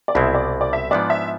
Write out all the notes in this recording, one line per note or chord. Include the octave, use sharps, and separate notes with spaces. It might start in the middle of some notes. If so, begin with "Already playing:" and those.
D5
C2 B2 G#3 C4 E4 E5
D5
D5
E5
G#2 F3 B3 D4 D5
E5